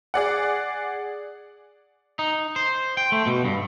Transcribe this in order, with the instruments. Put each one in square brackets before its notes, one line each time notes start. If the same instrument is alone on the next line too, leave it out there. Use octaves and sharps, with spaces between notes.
[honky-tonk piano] G#4 D5 F#5
[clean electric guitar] D#4
C5
G5
A3
B2
G2